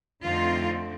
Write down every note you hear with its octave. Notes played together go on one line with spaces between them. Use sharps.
F2 D3 A3 C4 D#4 F4